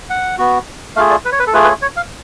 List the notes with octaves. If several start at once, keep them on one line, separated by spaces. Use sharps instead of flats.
F#5
B3 F#4
A3 F4 G#4 F5
D5
B4
C#5
B4
A4
A3 F4 G#4 B4
B4
C#5
C#5
F5